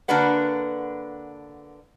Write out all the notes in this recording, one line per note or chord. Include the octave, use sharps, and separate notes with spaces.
D3 A#3 D4 F#4 B4 F#5